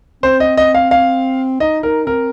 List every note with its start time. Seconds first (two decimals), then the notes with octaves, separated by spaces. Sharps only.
0.23 C4 C5
0.40 D#5
0.57 D#5
0.75 F5
0.91 F5
1.60 D#4 D#5
1.83 D#4 A#4
2.06 C4 A#4